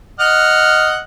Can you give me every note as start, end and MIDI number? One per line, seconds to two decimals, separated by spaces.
0.20 0.99 75
0.20 0.99 78
0.20 0.99 89